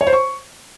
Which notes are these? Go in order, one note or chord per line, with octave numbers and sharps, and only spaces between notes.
C#5
C5
C#6